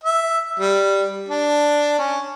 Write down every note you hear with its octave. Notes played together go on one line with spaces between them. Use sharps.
E5
G3
D4
C#4